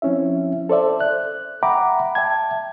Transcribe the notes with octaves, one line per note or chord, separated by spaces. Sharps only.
F3 C4 C#4 E4 E5
A4 C5 D5 E5
F#6
E5 F#5 G5 A#5 B5 D6
E5 G5 A5 G#6